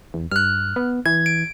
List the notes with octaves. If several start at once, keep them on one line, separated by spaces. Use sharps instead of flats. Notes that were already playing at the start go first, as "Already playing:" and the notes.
E2
G2 F6 F#6
B3
E3 G#6
D7